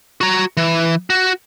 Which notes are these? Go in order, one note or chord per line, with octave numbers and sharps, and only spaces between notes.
F#4 A#5
E3
F#4